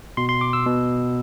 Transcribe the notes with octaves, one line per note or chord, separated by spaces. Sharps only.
B2 C6
C6
D6
E6
B2